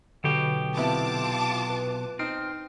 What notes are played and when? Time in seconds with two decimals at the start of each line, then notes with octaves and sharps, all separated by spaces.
0.24 B1 B2 D3 G4
0.77 C3 B3 E4 F4 A5 D6
1.70 B4
2.19 C4 D#4 F6